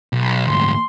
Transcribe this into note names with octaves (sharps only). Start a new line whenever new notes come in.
B1
D2 G#2 C6